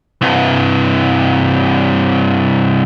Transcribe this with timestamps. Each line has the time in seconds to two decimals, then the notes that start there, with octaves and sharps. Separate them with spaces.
0.21 C2 G2